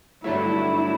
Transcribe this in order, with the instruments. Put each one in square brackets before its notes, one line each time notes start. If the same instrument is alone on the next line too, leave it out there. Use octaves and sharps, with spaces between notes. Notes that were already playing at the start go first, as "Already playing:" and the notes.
[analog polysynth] G2 D3 F#3 A3 [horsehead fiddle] E4